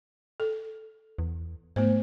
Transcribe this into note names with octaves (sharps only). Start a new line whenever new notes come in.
A4
E2
G#2 A3 B3 C5